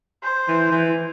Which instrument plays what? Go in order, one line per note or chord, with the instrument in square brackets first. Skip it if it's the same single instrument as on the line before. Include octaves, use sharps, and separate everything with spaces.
[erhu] C5
[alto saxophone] E3
E3